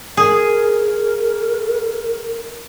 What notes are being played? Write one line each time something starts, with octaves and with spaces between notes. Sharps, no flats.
G#4 A#4